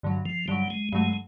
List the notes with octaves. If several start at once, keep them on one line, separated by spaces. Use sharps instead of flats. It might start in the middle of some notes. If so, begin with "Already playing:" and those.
G2 D3 F#3
F3
G2 D3 F#3 G3
G#3
G2 D3 F#3 G#3 A3